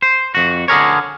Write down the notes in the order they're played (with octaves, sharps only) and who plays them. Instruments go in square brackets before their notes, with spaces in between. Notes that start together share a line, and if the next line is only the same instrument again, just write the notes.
[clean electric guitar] C5
F2 F#4
D3 G#4 A#4 C#5